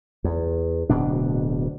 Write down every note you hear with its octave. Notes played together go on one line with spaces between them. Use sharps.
E2
D1 D2 B2 D4